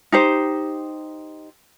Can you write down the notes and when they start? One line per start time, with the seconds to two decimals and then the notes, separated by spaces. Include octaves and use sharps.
0.12 D#4 G4 C5